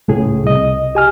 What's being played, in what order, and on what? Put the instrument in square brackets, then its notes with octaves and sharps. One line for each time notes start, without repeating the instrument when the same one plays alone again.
[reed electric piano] C#2 A2 G#4
C2 D#5
[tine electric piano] G4 G#5 F6